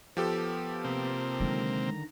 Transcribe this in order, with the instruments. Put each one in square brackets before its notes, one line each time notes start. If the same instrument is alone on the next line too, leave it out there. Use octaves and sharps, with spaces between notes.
[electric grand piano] F3 G4 A4 [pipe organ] B3
[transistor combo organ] C3 A#3 C4
[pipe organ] D3 D#3 A#5 [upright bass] F#3 G#3